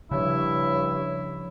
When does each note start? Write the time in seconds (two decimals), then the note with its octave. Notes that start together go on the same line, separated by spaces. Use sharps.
0.11 G2 C#3 F3 E4 C#5